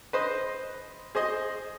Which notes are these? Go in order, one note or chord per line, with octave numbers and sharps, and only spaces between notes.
B4 C5 D#5
G#4 C5 D#5